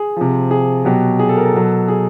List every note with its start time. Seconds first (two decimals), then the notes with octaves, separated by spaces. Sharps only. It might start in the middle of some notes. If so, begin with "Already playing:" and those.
Already playing: G#4
0.16 C3 F3
0.51 G#4
0.85 B2 F#3 G4
1.19 G#4
1.29 A4
1.37 A#4
1.45 A4
1.54 B2 F#3
1.88 G#4